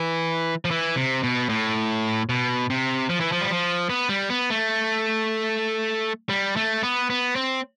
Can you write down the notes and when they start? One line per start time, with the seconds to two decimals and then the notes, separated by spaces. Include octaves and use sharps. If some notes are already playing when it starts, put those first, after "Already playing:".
Already playing: E3
0.65 F3
0.71 E3
0.96 C3
1.23 B2
1.49 A2
2.29 B2
2.70 C3
3.10 F3
3.20 E3
3.32 F3
3.42 G3
3.50 F3
3.89 B3
4.09 G3
4.30 B3
4.50 A3
6.29 G3
6.56 A3
6.83 B3
7.10 B3
7.36 C4